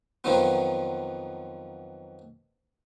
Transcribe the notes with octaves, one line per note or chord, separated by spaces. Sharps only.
F2 D#3 F3 F#3 B3